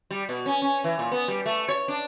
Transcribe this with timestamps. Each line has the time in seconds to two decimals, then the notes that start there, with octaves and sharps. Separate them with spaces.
0.11 G3
0.29 B2
0.46 C#4
0.62 C#4
0.84 E3
0.99 A#2
1.12 B3
1.28 G3
1.46 A3
1.68 C#5
1.88 D4